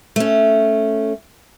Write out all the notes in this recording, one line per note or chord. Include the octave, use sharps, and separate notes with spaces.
A3 C#4